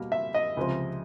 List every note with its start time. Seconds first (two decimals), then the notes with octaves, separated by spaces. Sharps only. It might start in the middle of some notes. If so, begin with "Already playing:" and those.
Already playing: B2 G3 A#3
0.12 E5
0.34 D#5
0.57 C#2 C3 F3